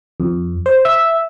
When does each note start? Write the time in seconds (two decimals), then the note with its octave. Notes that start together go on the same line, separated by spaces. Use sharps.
0.20 F2
0.66 C5
0.85 E5